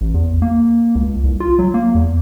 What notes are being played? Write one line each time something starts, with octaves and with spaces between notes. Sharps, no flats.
A1
E2
A#3
C#2
C2
F4
F#3
A#3
E2